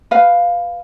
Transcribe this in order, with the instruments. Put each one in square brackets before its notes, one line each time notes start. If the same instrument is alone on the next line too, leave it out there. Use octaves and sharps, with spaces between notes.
[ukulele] B4 F5